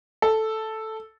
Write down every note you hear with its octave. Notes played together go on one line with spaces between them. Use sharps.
A4